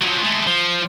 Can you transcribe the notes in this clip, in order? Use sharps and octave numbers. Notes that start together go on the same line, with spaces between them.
F3 F#3
G#3 A3
F3